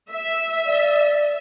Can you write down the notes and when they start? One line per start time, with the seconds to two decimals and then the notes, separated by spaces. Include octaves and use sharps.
0.12 E5
0.65 D5